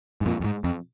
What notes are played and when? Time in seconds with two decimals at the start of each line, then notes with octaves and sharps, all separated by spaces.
0.21 G#2
0.26 F2 A#2
0.40 F2
0.44 G#2
0.64 F2